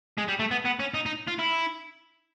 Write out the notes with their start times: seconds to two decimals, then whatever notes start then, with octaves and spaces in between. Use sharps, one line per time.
0.18 G#3
0.28 G3
0.39 A3
0.51 B3
0.65 B3
0.80 C#4
0.94 D#4
1.06 D#4
1.27 F4
1.39 E4